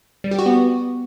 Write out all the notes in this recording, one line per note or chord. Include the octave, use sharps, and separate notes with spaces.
G3
G4
F#4
B3